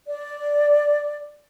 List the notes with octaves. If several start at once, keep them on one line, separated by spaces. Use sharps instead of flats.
D5